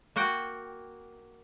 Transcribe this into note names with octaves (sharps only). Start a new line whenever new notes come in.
A#3 F#4 F#5 G5